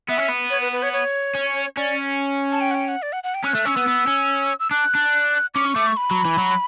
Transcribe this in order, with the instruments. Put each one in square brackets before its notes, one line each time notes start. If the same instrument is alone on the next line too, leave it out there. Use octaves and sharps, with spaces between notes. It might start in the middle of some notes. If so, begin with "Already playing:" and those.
[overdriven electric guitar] B3 [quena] E5
[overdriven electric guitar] C#4
B3
[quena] C#5
B4
B4
C#5
C#5
[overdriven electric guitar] C#4
[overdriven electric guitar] C#4 [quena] D5
[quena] A5
G5
F#5
G5
F#5
D5
F#5
F#5
G5
[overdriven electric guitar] C#4 [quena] F#6
[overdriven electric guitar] A3
[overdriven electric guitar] C#4 [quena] E6
[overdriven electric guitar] B3
B3
C#4
[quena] E6
[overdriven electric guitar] D4 [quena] F#6
[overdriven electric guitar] D4
[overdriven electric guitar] C#4 [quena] D6
[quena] C#6
[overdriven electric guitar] A3 [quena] D6
[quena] C#6
B5
[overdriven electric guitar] F#3
E3
F#3